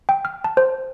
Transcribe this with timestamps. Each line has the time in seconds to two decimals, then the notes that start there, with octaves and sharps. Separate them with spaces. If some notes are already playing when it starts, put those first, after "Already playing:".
0.09 G5
0.25 F6
0.44 A5
0.57 C5